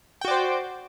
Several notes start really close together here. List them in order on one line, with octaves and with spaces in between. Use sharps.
G5 F#4 D5 C5